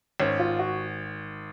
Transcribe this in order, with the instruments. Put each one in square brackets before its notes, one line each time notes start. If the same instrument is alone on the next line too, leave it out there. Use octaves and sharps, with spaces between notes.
[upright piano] G#1 [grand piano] C#4
[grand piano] F4
F#4